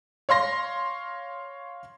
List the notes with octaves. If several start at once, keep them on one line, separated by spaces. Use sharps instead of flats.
C#5 F5 C6 A#6